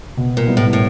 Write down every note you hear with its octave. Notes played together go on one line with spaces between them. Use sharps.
B2
A#2
G3 B3 E4
A2
A2